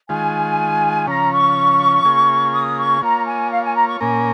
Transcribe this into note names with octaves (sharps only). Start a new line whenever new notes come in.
D#3 G#3 F4 G#5
C#3 F3 C#4 A#5
C#6
C#3 A#3 F4 G#4
D#6
C#6
A#3 F4 C#5 A#5
G#5
F5
G#5
A#5
C#6
A#2 A#3 C#4 A#4 G#5